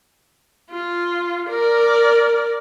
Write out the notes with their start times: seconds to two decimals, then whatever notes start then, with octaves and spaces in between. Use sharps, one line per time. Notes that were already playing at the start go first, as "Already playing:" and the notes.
0.70 F4
1.50 A#4 D5